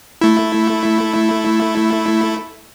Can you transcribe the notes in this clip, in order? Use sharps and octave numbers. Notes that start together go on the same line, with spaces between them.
A3 E4